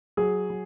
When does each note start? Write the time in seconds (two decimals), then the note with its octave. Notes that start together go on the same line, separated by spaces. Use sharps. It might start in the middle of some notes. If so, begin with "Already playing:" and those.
0.17 F#3 G#4
0.50 F#3